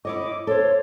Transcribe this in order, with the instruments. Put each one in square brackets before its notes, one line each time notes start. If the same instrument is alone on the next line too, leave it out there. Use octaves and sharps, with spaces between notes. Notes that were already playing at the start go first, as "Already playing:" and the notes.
[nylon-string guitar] E4 C#5 D#5 [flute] D6
[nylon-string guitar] A4 C5 [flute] C#5